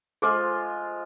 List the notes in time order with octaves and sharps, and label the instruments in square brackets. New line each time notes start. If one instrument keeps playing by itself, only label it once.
[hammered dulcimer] F3 G#3 F4 [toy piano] A4 D6